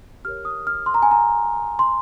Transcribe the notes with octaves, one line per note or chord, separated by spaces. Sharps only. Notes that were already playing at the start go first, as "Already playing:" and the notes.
G4 A#4 C#5 F6
D#6
F6
C6
A#5
G#5
A#5
C6